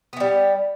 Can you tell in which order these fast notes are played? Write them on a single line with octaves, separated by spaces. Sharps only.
B3 E3 G3